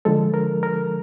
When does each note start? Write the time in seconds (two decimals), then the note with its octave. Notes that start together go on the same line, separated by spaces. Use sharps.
0.05 D3 F3 G#3 A4
0.34 A#4
0.63 A#4